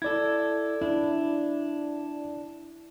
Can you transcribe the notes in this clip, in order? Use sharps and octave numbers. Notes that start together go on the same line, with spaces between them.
E4 A4 D5 G#6
D4 E4